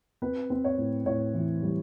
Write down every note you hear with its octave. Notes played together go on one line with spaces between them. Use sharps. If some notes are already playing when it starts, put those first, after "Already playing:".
C4 B4
C4
C#5
A2
A2 C#5
E3
G3